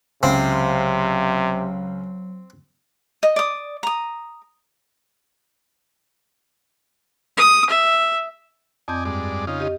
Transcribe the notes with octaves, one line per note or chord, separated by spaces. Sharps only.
C#2 C3 F#3 C4
D#5
D5 D#6
A#5 D#6
D#6
E5
F2 C4 D5 D#5 G#5 G6
G2 G#3 D5
C#3 D#4 F4
G4 D#5